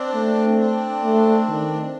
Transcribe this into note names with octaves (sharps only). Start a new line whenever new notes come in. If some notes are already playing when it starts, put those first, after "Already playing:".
Already playing: C4 D4
A3
C4 D4
A3
D#3